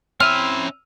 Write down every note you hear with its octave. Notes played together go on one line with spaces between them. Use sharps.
C4 C#4 E4 E5 E6 F6 D#7 F7